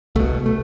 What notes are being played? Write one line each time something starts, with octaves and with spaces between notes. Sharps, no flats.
C2 B2 A3
A3